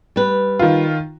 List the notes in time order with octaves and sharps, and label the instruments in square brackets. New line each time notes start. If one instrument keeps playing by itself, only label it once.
[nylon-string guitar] G3 B4
[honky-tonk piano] D#3 F4